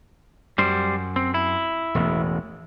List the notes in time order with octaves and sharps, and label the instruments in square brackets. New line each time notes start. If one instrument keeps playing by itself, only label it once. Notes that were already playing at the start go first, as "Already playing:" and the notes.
[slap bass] F#2 [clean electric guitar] G3 C5
[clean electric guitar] C4
E4
[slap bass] E1 A1 E2